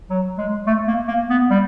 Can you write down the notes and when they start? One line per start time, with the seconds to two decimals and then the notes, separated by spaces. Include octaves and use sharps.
0.10 F#3
0.38 G#3
0.67 A3
0.88 A#3
1.08 A#3
1.30 B3
1.50 G3